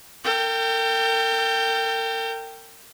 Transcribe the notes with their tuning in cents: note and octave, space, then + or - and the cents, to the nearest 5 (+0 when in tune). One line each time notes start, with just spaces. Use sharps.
A#4 -45 G5 +0